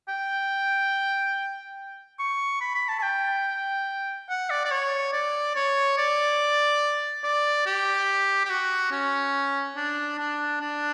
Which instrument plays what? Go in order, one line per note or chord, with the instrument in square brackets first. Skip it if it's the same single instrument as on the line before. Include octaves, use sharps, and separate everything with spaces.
[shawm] G5
C#6
B5
B5
A5
A5
G5
F#5
D5
D5
C#5
D5
C#5
D5
D5
G4
G4
F#4
C#4
D4
D4
D4